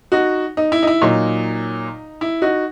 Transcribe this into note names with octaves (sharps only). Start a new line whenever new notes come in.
D#4 F#4
D#4
E4
D#4
E4
A#2 F#3 D#4
E4
D#4 F#4